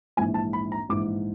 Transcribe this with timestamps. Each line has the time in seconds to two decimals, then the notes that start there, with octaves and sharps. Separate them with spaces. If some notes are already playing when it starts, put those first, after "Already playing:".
0.17 A#1 G#2 E3 G#5
0.34 A5
0.53 B5
0.72 A#5
0.89 A#1 G#2 E3 D6